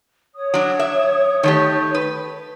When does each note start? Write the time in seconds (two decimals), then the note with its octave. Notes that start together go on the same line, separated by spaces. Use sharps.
0.35 C#5 D#6
0.54 F#3 D4
0.79 E5
1.43 D#3 A3 G4
1.95 B4